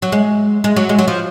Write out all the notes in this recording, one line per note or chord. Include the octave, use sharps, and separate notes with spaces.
F#3
G#3
G#3
F#3
G#3
F#3
F3